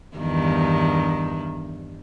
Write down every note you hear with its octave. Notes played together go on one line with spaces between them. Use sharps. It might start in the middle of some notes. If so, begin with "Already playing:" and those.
E2 G2 D#3